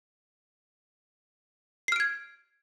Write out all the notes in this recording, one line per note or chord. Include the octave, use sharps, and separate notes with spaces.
F6 G#6 C7 D7